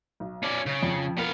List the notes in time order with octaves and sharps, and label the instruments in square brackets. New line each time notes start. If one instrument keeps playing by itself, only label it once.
[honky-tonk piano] B1
[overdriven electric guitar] C#4 D5
C#3
[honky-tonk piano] F2
[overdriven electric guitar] B3 F5 [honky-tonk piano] A#4